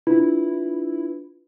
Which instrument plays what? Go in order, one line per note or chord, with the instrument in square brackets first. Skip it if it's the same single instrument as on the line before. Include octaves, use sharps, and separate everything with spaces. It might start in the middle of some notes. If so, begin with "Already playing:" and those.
[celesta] D4 F4 B4 [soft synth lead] E4